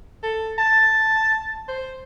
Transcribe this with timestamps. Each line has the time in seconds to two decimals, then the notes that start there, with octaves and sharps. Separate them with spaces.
0.23 A4
0.58 A5
1.69 C5